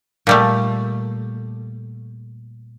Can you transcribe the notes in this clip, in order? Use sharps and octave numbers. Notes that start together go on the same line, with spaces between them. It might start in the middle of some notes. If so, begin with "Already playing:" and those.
A#2 G3 A3